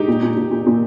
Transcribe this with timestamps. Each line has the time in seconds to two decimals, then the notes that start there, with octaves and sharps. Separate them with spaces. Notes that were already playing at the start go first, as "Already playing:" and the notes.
Already playing: G#3 D#4 G4
0.08 A#2
0.23 A#2
0.37 A#2
0.51 A#2
0.66 A#2